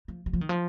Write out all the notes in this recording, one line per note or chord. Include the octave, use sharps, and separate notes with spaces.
F3
F#3
F3
D#3
F3